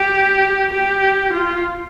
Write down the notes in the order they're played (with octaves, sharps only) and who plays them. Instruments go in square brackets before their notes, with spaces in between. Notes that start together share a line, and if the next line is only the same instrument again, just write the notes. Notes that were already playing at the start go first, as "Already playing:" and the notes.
Already playing: [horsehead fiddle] G4
G4
F4